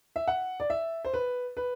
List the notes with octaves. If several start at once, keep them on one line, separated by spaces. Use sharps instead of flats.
E5
F#5
D5
E5
C5
B4
B4